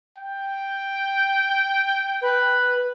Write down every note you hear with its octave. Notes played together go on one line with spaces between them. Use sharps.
G5
B4